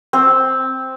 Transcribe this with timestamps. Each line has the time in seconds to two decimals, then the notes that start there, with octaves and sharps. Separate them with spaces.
0.13 C4